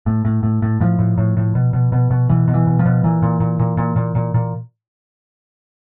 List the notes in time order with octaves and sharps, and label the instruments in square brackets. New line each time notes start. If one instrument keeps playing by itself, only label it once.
[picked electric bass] A2
A2
A2
A2
A2 F3
A2
A2
A2
B2
B2
B2
B2
B2 E3
B2
E3
B2
F3
B2
A#2 E3
A#2
A#2
A#2
A#2
A#2
A#2
A#2